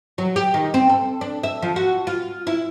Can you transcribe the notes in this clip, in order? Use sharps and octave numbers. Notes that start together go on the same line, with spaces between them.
F#3
G4
D#3
C4
A4
D4
E5
F3
F#4
F4
E4